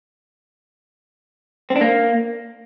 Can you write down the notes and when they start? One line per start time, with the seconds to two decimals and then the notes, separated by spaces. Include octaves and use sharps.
1.70 C4
1.76 D4
1.81 A#3